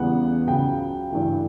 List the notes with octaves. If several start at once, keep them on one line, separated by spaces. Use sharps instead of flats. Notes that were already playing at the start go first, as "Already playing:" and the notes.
Already playing: E2 C#3 G3 B3 F#5
C#2 C#3 F#3 G5
G2 E3 A3